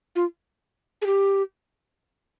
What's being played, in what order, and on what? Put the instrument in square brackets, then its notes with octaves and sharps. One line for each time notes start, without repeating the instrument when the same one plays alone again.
[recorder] F4
G#4
G4